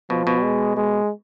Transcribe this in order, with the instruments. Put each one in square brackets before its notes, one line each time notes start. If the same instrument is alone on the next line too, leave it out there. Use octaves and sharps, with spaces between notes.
[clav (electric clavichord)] B2 [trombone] F3
[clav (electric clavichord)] B2
[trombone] G#3
G#3